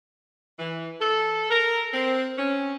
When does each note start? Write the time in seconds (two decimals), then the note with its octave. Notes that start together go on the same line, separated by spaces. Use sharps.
0.59 E3
1.01 A4
1.50 A#4
1.93 C4
2.38 C#4